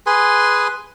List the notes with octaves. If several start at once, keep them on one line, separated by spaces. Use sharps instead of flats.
G#4 B4 G#5 C6